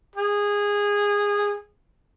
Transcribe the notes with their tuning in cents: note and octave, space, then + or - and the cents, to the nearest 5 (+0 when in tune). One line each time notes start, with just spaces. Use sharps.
G#4 -20